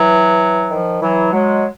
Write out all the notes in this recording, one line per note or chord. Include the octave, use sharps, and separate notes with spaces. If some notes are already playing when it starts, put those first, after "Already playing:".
Already playing: E3 F#3
D#3 F3
E3 F#3
F#3 G#3